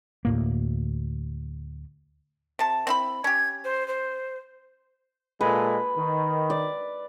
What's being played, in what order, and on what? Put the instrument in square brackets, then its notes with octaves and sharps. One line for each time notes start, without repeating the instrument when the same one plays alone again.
[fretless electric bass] D2 A2 A#3
[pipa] C3 A5
C4 E4 B5
[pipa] C#4 G4 [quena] G#6
[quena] C5
C5
[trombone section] A#2 G#3 A4 [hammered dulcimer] B4
[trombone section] D#3
[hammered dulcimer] D5